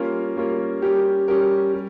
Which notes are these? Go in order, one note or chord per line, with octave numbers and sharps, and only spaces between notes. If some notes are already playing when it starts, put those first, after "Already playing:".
Already playing: G3 A#3 C#4 F4 A#4
G3 A#3 C#4 F4 A#4
G3 C#4 G4 A#4
G3 C#4 G4 A#4
G3